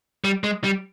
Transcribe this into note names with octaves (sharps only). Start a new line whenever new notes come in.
G3
G#3
G3